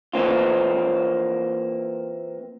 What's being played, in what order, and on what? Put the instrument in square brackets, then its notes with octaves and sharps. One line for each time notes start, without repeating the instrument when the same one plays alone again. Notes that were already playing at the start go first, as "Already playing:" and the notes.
[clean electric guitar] E3 A#3 C4 F4